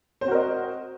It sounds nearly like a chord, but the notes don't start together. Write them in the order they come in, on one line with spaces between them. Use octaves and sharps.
C5 C4 F#4 A#4 D#5